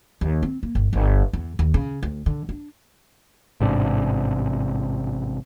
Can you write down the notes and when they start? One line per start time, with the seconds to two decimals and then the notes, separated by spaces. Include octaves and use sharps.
0.21 D#2
0.43 C4
0.63 A#3
0.75 G1
0.93 G1
1.33 E2
1.59 D#2
1.74 C#3
2.03 D2
2.26 D3
2.49 D4
3.60 A1 G#2 C3 D4